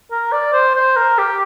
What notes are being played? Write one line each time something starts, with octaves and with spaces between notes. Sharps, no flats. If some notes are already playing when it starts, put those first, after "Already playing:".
A#4
D5
C5
C5
A#4
G4